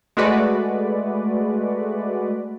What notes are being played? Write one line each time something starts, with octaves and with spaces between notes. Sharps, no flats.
G#3 A3 F#4 B4 D5